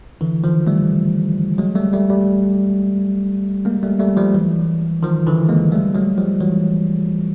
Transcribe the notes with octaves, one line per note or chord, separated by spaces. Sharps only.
D3 E3
D#3 F3
G3 A3
F#3 G#3
G3 A3
G3 A3
G3 A3
G#3 A#3
G3 A3
G3 A3
F3 G3
E3 F#3
D#3 F3
D3 E3
G#3 A#3
G3 A3
F#3 G#3
F3 G3
E3 F#3